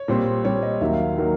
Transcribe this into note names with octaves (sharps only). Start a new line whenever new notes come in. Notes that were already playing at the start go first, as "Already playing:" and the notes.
Already playing: C#5
A#2 G3 C4
A#2 G3 C4 C#5
D#5
D#2 D#3 F#3 A#3 E5
F5
D#3 F#3 A#3